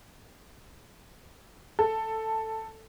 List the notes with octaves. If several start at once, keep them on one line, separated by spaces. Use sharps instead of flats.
A4